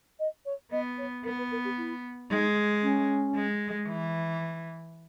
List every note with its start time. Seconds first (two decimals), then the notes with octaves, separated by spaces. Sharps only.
0.20 D#5
0.46 C#5
0.72 B3 D#5
0.98 C#5
1.25 B3 A#4
1.38 B4
1.51 A#4
1.65 G4
1.78 E4
2.30 G#3 D#4
2.83 C#4
3.35 G#3
3.89 E3